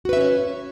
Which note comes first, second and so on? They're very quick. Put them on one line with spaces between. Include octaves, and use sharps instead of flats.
F#4 B4 E5 C#4 C#5